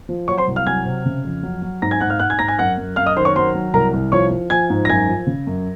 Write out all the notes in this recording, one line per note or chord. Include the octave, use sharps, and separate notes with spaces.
F3
F#3 C#5 C#6
C5 C6
C2
F5 F6
F#3 G#5 G#6
C3
C#3
F2
F#3
F#3
G#2 A#5 A#6
G#5 G#6
G#2 F#5 F#6
F5 F6
G#2 F#5 F#6
G#5 G#6
G#2 A#5 A#6
G#5 G#6
F#2 F#5 F#6
F#2
F#2 F5 F6
D#5 D#6
D#3 C5 C6
C#5 C#6
F#3 C5 C6
F#3
C2 A#4 A#5
C2
F3 C#5 C#6
F3
F3 G#5 G#6
G#2
A#6
F#2 G#5 G#6
F3
C#3
F#2